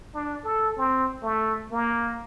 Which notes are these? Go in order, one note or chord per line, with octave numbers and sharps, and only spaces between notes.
D4
A4
C4
A3
A#3